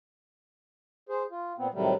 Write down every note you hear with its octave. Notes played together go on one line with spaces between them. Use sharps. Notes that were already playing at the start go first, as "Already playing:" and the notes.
G#4 C5
F4
A#2 B3 C4
A2 C3 D#3 F#3 G3 A3